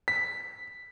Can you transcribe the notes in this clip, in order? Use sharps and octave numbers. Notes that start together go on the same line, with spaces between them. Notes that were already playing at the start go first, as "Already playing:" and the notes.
B6